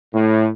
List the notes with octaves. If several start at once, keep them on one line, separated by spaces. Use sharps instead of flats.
A2